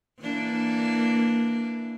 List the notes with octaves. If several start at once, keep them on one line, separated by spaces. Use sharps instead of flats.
E3 A#3 D4